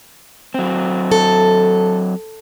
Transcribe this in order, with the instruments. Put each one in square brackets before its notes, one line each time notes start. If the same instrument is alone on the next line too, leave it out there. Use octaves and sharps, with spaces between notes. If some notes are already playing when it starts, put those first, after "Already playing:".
[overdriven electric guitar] F#3 C4
[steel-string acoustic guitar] A4